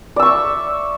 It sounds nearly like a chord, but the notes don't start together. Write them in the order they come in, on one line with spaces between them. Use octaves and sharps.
D5 E6 C#6 E5